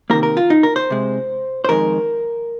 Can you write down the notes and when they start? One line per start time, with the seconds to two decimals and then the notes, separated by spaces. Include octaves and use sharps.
0.10 C3 D#3 A#3 A#4
0.23 A#4
0.37 F4
0.50 D#4
0.63 A#4
0.76 C5
0.90 C3 G#3
1.64 C5
1.69 F2 D#3 G#3 A#4